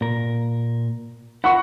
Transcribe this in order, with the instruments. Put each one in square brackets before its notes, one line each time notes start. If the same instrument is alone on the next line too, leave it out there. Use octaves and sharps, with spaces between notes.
[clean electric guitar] A#2 A#4
[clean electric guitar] E4 F4 A#4 [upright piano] F#5 C#6